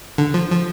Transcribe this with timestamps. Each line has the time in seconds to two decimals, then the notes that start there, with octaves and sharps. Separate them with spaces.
0.18 D3
0.34 F3
0.51 F3